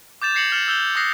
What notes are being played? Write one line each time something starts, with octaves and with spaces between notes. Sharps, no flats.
D6 G6 A6 E7 F7
G#6 A#6 C7 C#7 F7 F#7
F6 G6 A6 C#7 E7 F#7
E6 F6 G6 F7 G7
D6 D#6 F#6 A#6 C7